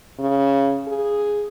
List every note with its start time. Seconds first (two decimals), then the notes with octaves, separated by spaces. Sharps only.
0.19 C#3
0.88 G#4